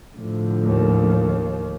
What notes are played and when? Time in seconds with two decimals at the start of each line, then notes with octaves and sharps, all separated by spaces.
0.15 A2 D3 F3
0.65 D#2